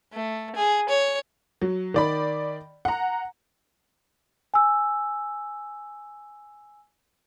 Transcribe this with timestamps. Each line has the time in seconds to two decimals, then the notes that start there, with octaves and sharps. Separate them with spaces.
0.13 A3
0.56 G#4
0.89 C#5
1.62 F#3
1.94 D#3 D5 B5
2.85 F#5 A#5
4.54 G#5 E6